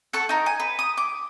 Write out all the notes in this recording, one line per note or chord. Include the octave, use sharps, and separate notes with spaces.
A4 F#5 C#6
D#4 A#4
G#5
B4
D#6
D6